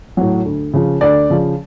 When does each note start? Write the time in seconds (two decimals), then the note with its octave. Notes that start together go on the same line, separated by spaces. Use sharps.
0.17 A2 F#3
0.45 D2
0.74 C#3 F3
1.01 D2 D5
1.30 C#3 F3